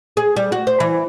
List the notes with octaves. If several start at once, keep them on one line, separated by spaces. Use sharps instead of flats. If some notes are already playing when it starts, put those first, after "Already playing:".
G#4
G3
F#4
C5
E3